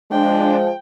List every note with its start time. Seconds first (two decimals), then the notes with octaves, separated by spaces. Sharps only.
0.12 F3 G#3 D4 G5